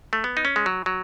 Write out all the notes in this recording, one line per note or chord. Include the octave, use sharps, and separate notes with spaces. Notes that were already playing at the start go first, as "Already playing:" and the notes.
A3
B3
D#4
C#4
G#3
F#3
F#3